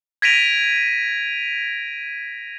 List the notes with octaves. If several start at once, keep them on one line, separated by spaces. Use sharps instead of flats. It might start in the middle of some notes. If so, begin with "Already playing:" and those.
G#6 A#6 B6 D7 D#7 F7